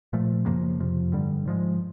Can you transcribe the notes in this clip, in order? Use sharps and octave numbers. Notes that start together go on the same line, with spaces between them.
A#2 F3 A3
F#2 C#3 F3 A#3
F2 C3 F3
G2 D3 G3
G#2 F3 G#3